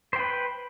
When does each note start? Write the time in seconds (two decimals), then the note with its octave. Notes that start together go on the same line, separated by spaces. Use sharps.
0.13 C5
0.16 G5
0.19 B4